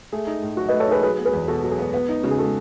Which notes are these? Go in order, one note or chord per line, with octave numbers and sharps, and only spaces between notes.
A3 G#4
D#4
A2
F#3 F#4
B4 D#5
A3
A4 C#5
D#4 G#4 B4
F#3 G#4 B4
B3
G#4 B4
E2
B2 F#4 A4
F#3
G#4
B3
B3
D#4
C#3 F#4
G#4
G#3 F#4 A4